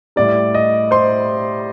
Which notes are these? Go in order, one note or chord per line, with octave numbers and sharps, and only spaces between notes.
A2 G3 D5
D#5
C5 C6